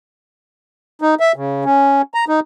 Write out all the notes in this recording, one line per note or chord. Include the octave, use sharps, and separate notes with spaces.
D#4
E5
C#3
C#4
A#5
D#4